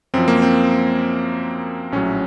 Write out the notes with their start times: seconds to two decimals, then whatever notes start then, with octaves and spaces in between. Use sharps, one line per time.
0.14 F#2 F3 C4
0.28 A#3
0.42 C4
1.92 A#1 A2 F#3 C#4